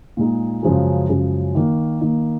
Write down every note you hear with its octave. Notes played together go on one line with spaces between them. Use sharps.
A#2 G#3 D#4
F#2 C#3 F3 G#3
F#2 C#3 F3 G#3
D#3 A#3 D#4
D#3 A#3 D#4